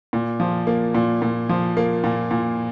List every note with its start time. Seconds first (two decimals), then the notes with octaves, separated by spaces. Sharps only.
0.13 A#2
0.40 F3
0.67 A#3
0.95 A#2
1.22 A#2
1.49 F3
1.77 A#3
2.04 A#2
2.31 A#2